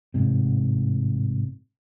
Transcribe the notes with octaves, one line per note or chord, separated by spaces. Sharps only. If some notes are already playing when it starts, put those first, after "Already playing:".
A1 G#2 C3